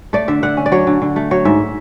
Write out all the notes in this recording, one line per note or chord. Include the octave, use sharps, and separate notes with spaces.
A3 D5
D3 E5
D3 F#5
C#4
D5
F#3 C#5
D3
D3
A3
F#3 C#5
G#2 E5